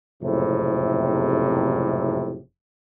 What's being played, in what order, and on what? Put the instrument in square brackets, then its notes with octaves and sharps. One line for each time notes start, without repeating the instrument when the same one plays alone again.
[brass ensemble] F#1 F2 A2 C3